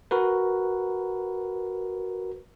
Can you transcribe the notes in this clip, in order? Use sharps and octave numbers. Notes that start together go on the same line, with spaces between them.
F#4 A#4 B4